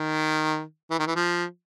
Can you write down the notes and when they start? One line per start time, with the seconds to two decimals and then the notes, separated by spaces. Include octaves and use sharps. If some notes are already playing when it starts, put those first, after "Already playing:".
Already playing: D#3
0.90 E3
0.99 D#3
1.07 E3
1.15 F3